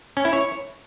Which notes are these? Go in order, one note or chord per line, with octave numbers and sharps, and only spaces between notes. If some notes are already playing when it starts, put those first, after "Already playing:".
C#4
E4
C#5